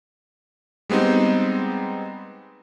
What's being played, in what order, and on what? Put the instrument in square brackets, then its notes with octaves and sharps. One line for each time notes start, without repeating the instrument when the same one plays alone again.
[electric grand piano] G3 G#3 B3 C4 D#4